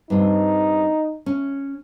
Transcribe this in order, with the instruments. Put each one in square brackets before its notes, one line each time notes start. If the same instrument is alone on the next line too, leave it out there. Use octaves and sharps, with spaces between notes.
[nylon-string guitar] G2 C4 [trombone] D#4
[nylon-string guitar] C#4